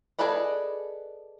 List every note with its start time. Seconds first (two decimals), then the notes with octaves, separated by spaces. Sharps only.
0.19 G#4 A4 B4 D5 D#5